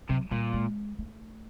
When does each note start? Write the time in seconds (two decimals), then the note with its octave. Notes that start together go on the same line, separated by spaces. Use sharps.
0.09 C3 F#3
0.31 A#2 G3
0.54 G#3
0.98 A3